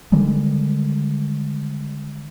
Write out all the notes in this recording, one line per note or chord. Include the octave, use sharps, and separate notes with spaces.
D3 D#3 G3 G#3